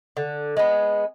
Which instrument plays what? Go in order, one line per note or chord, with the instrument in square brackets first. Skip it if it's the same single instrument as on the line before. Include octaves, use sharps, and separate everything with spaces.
[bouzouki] D3
G#3 B3